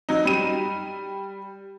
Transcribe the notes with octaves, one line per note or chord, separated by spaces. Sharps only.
F#3 D#4
G3 D#7